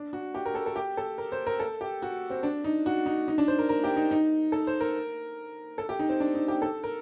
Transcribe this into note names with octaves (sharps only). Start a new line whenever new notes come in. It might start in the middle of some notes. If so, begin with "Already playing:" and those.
Already playing: D4
F#4
G4
A#4
A4
A4
G4
A4
A#4
C5
A#4
A4
G4
F#4
C4
D4
D#4
F#4
D#4
D#4
D4
C5
A#4
A#4
G4
D#4
D#4
A4
C5
A#4
A4
G4
D#4
C4
D4
D#4
G4
A4
A#4